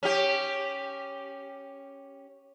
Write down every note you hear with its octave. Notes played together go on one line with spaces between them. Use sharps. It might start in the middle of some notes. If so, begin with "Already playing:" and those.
C#4 G4